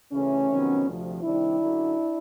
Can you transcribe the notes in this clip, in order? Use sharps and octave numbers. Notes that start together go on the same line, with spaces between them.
D2 C#3 E3 A3 C#4
F2 C3 D#3 F#3 B3
D2 C3 F3
C3 D#3 G3 D4 E4
F#2 D3 F#3